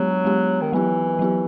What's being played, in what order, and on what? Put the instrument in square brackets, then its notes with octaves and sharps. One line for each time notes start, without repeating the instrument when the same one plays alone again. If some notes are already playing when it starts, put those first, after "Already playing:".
Already playing: [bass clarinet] F#3 [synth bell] G#3 B3 D4 G4
[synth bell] G#3 B3 D4 G4
[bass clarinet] D#3
[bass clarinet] E3 [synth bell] F#3 B3 E4 G4
[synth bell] F#3 B3 E4 G4